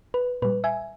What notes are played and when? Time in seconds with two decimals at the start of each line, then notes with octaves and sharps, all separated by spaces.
0.14 B4
0.42 A#2 G3 B4
0.64 E5 G#5